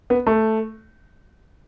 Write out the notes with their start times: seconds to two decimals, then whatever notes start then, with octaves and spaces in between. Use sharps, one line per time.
0.10 B3
0.27 A3